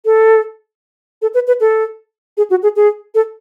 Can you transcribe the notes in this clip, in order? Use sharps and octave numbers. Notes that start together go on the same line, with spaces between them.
A4
A4
B4
B4
A4
G#4
F#4
G#4
G#4
A4